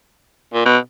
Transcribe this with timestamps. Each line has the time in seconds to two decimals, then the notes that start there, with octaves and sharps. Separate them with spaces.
0.54 A#2
0.65 B2